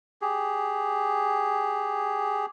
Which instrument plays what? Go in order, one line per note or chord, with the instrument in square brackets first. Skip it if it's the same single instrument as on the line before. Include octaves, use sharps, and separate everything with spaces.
[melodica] G4 G#4